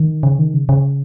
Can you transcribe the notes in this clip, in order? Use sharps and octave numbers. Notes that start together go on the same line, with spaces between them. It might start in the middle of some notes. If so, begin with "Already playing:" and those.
Already playing: D#3
C#3
D#3
C#3
C#3